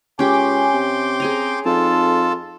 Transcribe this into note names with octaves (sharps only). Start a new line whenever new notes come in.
C#2 C#4 G4 G5 G#5 C6 D6
C3
C4 G#4 G#5 A#5
F2 D#4 F4 A4 A5